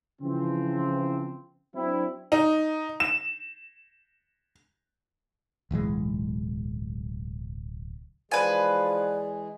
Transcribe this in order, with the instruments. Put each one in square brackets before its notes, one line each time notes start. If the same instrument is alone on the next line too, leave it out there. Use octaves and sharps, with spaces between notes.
[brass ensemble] C#3 E3 F3 C4
F#3 C4 D4 E4
[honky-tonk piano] D#4
E7
[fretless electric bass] D1 B1 E3 G#3
[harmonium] E3 G#3 G#4 [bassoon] F3 [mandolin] B4 G#5 [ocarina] D5